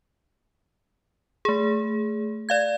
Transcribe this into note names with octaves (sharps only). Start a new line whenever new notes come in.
A3 G#4
D5 F5 G#6